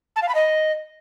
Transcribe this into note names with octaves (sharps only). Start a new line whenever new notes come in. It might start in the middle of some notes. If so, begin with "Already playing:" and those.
A5
F5
B5
D#5